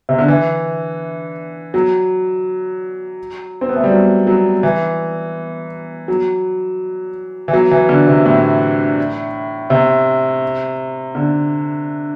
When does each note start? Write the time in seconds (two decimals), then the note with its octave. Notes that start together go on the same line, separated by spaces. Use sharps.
0.09 C3
0.19 D3
0.28 E3
1.74 F#3
3.61 C4
3.69 B3
3.76 A3
3.84 G3
3.91 F#3
4.27 F#3
4.63 E3
6.08 F#3
7.48 E3
7.53 F#3
7.71 E3
7.89 D3
8.07 C3
8.25 A2
9.70 C3
11.15 D3